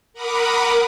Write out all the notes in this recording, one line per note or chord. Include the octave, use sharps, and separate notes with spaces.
A#4 F#5 B5 D6 D#6